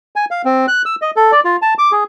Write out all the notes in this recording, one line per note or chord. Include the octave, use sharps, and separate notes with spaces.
G#5
F5
C4
F#6
E6
D#5
A4
D5
F4
A5
D6
G#4